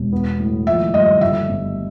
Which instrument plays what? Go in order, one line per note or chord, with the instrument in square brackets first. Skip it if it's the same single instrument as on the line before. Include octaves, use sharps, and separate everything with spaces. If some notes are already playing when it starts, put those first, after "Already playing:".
Already playing: [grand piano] E1
B3
A2
[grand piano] F3 [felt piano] E5
[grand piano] G2 [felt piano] D#5
[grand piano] D3 [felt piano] E5
[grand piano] G1